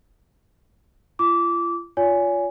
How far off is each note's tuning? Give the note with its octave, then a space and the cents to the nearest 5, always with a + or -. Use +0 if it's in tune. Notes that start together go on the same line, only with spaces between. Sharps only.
F4 -40 D6 -20
F4 +0 C#5 +45 G#5 +0